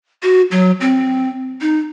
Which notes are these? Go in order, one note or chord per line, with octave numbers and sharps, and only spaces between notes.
F#4
F#3
C4
D#4